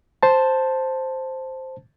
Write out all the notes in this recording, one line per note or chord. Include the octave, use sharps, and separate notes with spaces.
C5 A5